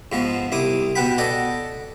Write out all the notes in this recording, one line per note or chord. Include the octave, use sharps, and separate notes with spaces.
G#2 F3 B3
C2 E4 D6 D#6
B2 B4 F#5 G5 B5
A4 D5 D#5 F#5